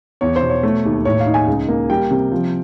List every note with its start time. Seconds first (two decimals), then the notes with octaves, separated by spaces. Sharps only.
0.21 E2 C#5
0.36 C5
0.42 B2
0.50 C#5
0.63 A3
0.85 D#2
1.05 A2 C#5
1.20 F5
1.27 D#4
1.34 G#5
1.48 C#2
1.68 A#3
1.90 G3 G5
2.11 C3
2.32 F3